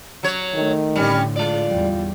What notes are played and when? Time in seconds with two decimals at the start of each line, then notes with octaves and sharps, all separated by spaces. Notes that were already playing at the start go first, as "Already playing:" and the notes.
0.23 F#3 C#5
0.55 D#3 A3
0.96 A2 D3 G3 C#4
1.36 G#3 F4 D5
1.68 E2 G3